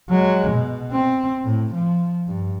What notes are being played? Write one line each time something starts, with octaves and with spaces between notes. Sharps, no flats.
F#3 G#3
B2
C4
A2
F3
G2